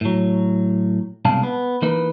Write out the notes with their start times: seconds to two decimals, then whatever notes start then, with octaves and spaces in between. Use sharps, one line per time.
0.01 A2 F#3
1.25 C2 B2 G#3 D4 F5 A5
1.43 B3
1.82 E3 A#3 D#4 B4